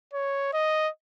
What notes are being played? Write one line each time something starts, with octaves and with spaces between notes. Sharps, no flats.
C#5
D#5